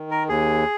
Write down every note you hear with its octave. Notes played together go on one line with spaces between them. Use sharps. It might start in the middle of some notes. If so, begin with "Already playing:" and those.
Already playing: D#3
A#4
D#2 G#4